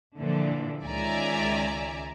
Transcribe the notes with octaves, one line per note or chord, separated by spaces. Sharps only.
A#2 D3 E3 F3 D4
C#2 D#3 D5 E5 G#5 A#5